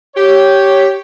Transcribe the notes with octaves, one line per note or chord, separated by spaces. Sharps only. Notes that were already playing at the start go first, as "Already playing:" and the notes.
G4 C#5